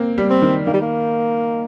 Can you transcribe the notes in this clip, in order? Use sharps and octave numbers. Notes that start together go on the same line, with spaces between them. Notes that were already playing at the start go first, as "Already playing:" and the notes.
Already playing: A#3 C4
G3
C4
D#3
D#3 A#3
G3
A#3